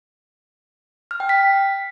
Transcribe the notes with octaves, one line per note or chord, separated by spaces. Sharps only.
F6
G5
B6